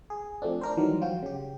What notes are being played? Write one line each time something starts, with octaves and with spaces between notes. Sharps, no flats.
G#4
F3 A3 C4 D4
D4 A#4 C5
D#3 E3 F#3 G3
F3 F4 F#4 G5
C#3 G4